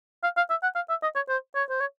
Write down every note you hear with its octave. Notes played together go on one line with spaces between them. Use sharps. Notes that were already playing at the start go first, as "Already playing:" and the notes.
F5
F5
E5
F#5
F5
E5
D#5
C#5
C5
C#5
C5
C#5